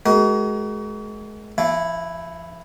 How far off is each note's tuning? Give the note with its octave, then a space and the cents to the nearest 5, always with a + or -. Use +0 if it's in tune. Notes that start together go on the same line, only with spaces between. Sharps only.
G#3 +30 F#4 +40 A#4 +20
F3 -40 E4 +0